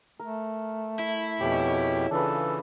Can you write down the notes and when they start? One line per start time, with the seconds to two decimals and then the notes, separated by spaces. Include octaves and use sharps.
0.20 A3 A#4
0.99 E4
1.40 F2 B2 G4 G#4 C#5 F#5
2.11 C#3 E3 D4 F4 A4 B4